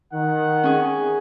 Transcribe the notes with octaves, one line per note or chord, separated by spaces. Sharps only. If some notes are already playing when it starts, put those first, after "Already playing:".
D#3 F#5
C#4 G#4